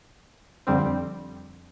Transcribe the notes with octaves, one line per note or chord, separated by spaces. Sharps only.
F2 D3 G3 C4